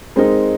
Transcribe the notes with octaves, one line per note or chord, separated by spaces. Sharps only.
G#3 C4 D#4 A#4